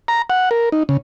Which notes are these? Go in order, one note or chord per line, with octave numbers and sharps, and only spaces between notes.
A#5
F#5
A#4
D#4
C#3